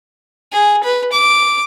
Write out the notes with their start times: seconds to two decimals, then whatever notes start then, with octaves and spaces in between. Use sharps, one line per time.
0.53 G#4
0.84 B4
1.12 D6